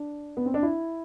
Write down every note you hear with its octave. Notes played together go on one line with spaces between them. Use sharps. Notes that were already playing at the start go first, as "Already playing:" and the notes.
Already playing: D4
B3
C4
D4
E4